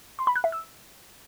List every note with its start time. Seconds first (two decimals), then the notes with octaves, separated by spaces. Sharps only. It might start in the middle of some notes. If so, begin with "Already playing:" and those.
0.19 C6
0.27 B5
0.36 F#6
0.44 E5
0.52 E6